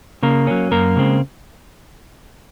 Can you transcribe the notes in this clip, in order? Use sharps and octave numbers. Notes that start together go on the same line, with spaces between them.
C#3 A#3 A#4
F#3 C#4
F#2 A#3 A#4
C#3 G#3 C4